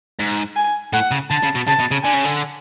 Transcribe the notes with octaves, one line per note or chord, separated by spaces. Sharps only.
G#2
G#5
A2 F#5
C#3
D3 A5
C#3
B2
C#3 A5
B2
C#3
D3 G#5
C#3
D3